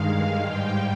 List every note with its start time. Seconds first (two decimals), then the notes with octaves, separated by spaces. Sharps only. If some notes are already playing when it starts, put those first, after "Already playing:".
Already playing: G2 D#3 G#3 F5
0.43 G#2 G3 G5